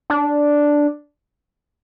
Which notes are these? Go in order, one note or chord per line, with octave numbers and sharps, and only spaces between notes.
D4